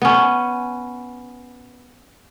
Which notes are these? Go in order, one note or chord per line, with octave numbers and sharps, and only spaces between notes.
B3 C#4